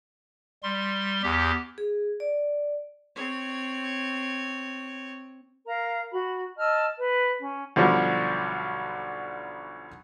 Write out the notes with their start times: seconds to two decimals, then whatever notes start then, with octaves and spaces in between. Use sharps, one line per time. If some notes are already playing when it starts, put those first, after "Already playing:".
0.63 G3 C6
1.23 E2 G4
1.78 G#4
2.20 D5
3.15 C4 C#5
5.66 A#4 F5 A#5
6.12 F#4 B5
6.57 D#5 A5 E6 F6
6.98 B4
7.40 C#4
7.76 B1 D3 F3 G3